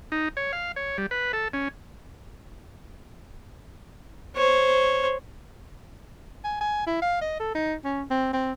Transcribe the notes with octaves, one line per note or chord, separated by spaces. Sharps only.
D#4
C#5
F5
C#5
G3
B4
A4
C#4
C5 C#5
G#5
G#5
E4
F5
D#5
A4
D#4
C#4
C4
C4